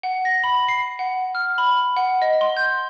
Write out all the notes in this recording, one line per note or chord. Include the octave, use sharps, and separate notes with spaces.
F#5
A#6
B5
C7
F#5
F6
B5
F#5
D#5
C6
G6